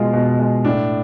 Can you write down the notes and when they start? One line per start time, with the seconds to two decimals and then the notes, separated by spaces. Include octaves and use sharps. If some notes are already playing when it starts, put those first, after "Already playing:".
Already playing: B2 G#3 F4
0.13 B2
0.39 G#3
0.64 A2 D4